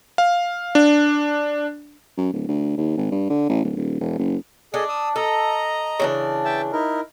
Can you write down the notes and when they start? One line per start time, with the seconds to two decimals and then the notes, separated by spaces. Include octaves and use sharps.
0.18 F5
0.75 D4
2.17 F#2
2.33 D1
2.49 D2
2.77 D#2
2.97 G#1
3.11 G2
3.30 D3
3.49 A1
3.64 D1
3.76 D#1
4.00 E1
4.19 F#1
4.74 D4 G#4 A4 D#5
4.89 D#6 E6
5.16 A4 D#5 A#5
6.00 C#3 E3 D4
6.45 E5 G5 A5
6.72 D#4 E4 A#4